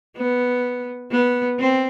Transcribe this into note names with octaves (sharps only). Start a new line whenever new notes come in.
B3
B3
C4